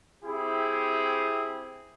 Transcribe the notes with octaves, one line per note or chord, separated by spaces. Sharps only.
C4 E4 G4 G#4